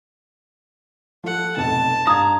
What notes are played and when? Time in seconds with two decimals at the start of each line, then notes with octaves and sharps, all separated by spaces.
1.24 F3 A4 F#5
1.57 F1 B1 F2 A5
2.07 G2 F5 A#5 D#6 G#6